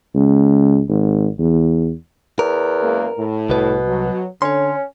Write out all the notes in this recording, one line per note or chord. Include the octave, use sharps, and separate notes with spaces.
C#2
G#1
E2
E2 A#4
F#2 G#3 A#3
A2
C2 B2 B4
F#3
D3 C#4 C#5 C6